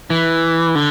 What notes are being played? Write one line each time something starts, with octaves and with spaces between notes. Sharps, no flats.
E3
D3